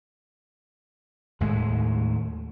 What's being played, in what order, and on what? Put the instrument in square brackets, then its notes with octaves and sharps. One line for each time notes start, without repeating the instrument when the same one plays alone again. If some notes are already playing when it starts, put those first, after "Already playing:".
[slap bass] D#2 A2 G#3